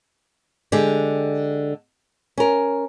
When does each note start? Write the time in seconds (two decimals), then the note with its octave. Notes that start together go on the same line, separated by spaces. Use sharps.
0.72 D3 G#3 G4
2.38 C#4 A#4